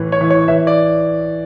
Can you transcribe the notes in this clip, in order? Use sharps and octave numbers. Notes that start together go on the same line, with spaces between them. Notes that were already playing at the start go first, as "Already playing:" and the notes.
Already playing: A2 E3
C#5
E3
C#5
E3 E5
D5